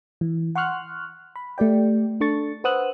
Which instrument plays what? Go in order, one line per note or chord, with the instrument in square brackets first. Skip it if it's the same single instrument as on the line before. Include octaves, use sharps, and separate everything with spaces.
[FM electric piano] E3
F#5 C6 C#6 F6 F#6
B5
A3 G4 D5 G5
D4 A4 C#6 A6
B4 C5 F#5 D#6 E6 F#6